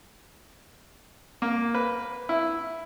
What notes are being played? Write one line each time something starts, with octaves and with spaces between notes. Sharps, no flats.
A#3
B4
E4